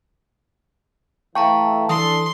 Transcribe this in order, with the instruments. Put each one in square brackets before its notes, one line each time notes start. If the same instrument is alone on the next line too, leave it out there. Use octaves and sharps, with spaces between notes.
[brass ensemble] E3 A3 [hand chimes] F5 A5 A#5 [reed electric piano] G5 C#6
[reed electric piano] E3 [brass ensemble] D4 A4 [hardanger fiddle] C6 [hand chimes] D#6